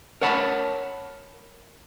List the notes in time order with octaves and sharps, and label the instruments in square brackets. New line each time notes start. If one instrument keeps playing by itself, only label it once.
[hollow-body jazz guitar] A#4 C#5 F#5 A5 B5